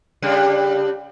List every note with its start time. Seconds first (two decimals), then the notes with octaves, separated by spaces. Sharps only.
0.22 C#3 G3 D4